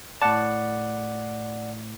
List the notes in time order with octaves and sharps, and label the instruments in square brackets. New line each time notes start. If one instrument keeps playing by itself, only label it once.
[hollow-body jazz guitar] A2 A5 [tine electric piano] D5 F#5